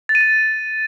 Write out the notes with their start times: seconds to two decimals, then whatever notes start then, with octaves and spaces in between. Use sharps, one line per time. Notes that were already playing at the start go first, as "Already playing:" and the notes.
0.09 A6
0.15 D#7
0.21 A6